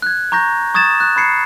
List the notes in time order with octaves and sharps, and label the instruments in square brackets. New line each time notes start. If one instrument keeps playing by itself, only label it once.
[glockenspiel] F#6 G#6
A#5 C#6 G6 A#6
C#6 D#6 G#6 A6 E7
F#6
B5 G#6 C7 C#7